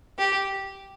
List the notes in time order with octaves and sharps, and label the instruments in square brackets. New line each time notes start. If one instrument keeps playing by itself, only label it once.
[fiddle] G4